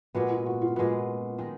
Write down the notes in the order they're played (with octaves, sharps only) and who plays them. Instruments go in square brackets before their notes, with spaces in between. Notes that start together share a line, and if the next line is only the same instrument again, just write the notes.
[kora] A#2 G#3 B3 [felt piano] F#4
[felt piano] F4
F#4
F4
[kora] A#2 G#3 B3 [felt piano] F#4
[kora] D#3 G#3 D#4